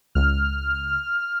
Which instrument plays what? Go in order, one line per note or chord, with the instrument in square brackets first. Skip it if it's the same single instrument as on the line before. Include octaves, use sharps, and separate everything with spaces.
[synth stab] C#2 [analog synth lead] F6